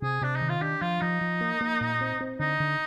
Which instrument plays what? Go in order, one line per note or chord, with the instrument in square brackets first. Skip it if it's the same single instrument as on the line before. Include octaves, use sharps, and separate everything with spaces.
[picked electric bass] C3 [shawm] G#4
[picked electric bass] C3 [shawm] D4
[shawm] D#4
[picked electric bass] D#3
[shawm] F4
[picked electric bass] D4 [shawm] G4
[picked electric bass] F3 [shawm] F4
[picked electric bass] F3 [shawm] D#4
[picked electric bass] F3
A#3
A#3
A#2
C4
C4
[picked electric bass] D3 [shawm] D#4
[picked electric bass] D3